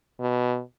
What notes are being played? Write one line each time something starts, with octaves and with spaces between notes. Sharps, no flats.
B2